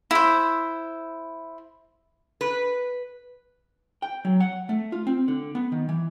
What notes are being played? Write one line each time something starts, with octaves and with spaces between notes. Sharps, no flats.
E4 C5
B4
G5
F#3
F#5
A3
F4
C4
D3
B3
D#3
E3